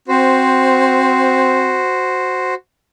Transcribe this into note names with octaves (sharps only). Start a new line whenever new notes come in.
C4 F#4 C5